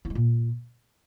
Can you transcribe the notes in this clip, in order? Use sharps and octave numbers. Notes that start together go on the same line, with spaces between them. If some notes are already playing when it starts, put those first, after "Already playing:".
E4
G#3
A#2